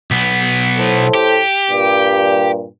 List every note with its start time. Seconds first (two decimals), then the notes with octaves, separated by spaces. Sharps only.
0.11 B1 B3
0.78 A2 A4 C5
1.14 G4
1.70 G2 A#2 G3